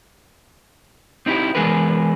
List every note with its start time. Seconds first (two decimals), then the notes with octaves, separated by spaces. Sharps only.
1.26 C4 D#4 E4 F#4 G4
1.55 E3 G#3 B3 G#4 A#4 B4